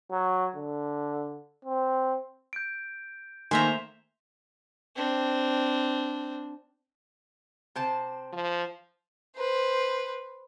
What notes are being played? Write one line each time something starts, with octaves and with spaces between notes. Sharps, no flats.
F#3
D3
C4
G6 D7
D#3 A3 A#3 C5 E5 G#5 A#5 C6
C4 D4
C3 C5 A5
F3
B4 C5